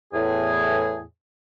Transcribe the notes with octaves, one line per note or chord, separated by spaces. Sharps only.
E2 A2 G#4